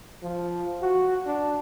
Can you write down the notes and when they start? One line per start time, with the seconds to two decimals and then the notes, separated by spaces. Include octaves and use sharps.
0.23 F3
0.82 F#4
1.26 D4